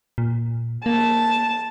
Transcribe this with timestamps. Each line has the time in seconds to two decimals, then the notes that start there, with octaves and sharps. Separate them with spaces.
0.18 A#2
0.86 A#3 A5